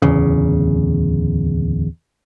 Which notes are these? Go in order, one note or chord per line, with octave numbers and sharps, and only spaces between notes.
D1 E2 C#3